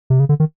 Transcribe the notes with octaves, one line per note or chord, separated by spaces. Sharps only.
C3
C#3
D3
D#3